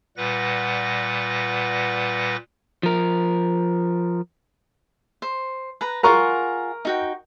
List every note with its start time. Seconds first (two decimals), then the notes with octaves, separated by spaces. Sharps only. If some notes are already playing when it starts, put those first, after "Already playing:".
0.17 A#2 G3 B4 F#5 A#6
2.83 F3 A#4
5.22 C5
5.81 B4 A#5
6.03 F4 G#4 A#4 F#5 A#5 C#6
6.85 D#4 F#4 G5